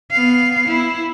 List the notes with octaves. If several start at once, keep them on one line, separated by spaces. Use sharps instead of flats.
B3 F5
E4